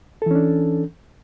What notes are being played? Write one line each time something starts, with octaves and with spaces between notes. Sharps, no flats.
E3 C#4 D4 A4